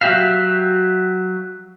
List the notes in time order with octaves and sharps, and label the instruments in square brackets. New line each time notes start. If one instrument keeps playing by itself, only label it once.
[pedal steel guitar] F#3 F#4 G4 E5 F5